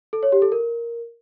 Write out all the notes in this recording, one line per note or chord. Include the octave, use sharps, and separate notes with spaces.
A4
C#5
G4
A4
A#4